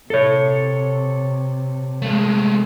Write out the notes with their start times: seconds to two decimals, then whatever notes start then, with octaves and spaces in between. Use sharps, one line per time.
0.10 C3 A4 C#5
2.02 G#3 A3